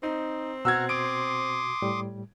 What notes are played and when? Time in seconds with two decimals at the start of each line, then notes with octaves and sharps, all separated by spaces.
0.03 C4 D#4
0.65 B2 F#4 F#5 A#5 E6 F6 G#6
0.89 C6 D6 D#6 D7
1.82 A2 G3